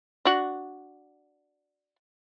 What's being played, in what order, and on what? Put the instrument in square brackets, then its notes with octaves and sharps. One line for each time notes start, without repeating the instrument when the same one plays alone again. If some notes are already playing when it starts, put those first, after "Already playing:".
[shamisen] D4 F#4